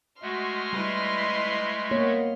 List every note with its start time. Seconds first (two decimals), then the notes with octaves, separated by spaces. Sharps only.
0.22 G#3 A3 F#4 D#5 C6 F6
0.73 G3 E4 B4
1.91 A#3 B3 C#5